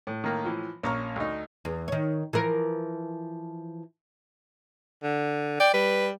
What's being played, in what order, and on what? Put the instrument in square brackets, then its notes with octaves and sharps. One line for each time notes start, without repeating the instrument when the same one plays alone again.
[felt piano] A2
[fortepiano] D#3 A#3
E3 F3
[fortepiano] A#1 A#5 [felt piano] C#4 C#6 F6
[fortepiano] D2 D#4
[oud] E2
D#3 C#5
E3 F3 A#4
[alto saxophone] D3
[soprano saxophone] D5 [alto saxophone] G5
[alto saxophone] G3 [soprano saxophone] B4